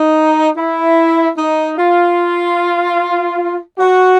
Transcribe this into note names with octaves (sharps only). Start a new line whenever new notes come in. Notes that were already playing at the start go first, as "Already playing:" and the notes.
Already playing: D#4
E4
D#4
F4
F#4